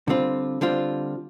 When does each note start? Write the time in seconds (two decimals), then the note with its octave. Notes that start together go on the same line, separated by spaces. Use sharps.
0.08 D3 G3 C4 F4
0.61 D3 G3 C4 F4